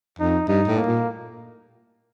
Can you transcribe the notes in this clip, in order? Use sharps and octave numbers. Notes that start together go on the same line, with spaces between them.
F2 D#4
G2 D#4
A2
A#3
A#2